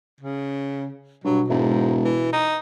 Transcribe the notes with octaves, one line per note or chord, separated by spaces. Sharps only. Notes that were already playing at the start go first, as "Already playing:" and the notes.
C#3
G2 B2 F#3
E1 G#2
E3
D#4